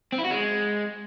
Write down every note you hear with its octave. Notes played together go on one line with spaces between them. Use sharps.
C4
E4
F#4
G#3